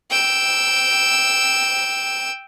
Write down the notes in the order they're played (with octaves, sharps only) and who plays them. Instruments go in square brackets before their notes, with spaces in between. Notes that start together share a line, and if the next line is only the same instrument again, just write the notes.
[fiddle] G5 E6